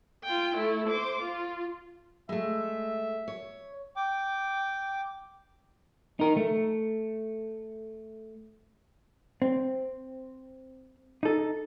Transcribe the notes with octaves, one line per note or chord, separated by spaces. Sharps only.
F4 G5
A3 E4
C5 D6
F4
G#3 A3 E5
C#5
G5 D6
D#4 A#4
A3
C4
D#4 A4